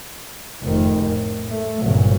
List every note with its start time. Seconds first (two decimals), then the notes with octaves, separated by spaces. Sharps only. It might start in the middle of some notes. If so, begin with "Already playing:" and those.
0.62 F1 G#2 D#3
1.03 A2
1.52 A3
1.83 G1 A#2 C#3 F#3